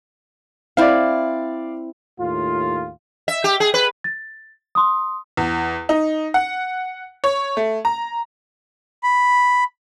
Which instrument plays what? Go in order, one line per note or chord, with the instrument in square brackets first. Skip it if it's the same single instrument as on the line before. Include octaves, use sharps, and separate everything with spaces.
[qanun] C4 E4 [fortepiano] D5 F5
[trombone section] D#2 A2 F4
[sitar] E5
G4
G#4
B4
[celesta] A6
C6 D#6
[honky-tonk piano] E2
D#4
F#5
C#5
A3
A#5
[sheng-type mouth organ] B5